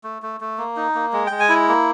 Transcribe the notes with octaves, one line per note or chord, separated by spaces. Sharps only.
A3
A3
A3
A#3
D#4
A#3
G#3
G#3 G5
G#5
E4
A#3